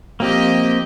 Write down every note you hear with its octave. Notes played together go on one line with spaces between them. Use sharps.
F3 A#3 C4 G4 D#5